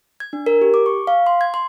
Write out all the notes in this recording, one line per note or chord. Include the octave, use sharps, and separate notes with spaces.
G#6
D4
A#4
G4
D6
C#6
F5
C6
G#6
C6